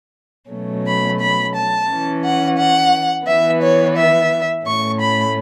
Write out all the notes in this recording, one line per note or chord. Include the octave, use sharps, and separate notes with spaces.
B2 F#3 A3 C#4
B5
B5
A5
E3 C#4
F#5
F#5
E3 B3 E5
C#5
E5
A2 A3 C#4 C#6
B5